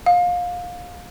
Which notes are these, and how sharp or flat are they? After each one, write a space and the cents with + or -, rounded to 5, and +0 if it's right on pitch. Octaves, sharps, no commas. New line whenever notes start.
F5 +25